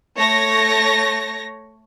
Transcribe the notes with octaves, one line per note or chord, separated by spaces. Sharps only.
A3 C#5 A#6